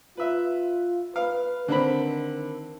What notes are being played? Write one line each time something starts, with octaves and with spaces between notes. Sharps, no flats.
F4 B4 E5
B4 F5
D3 D#3 C4 B5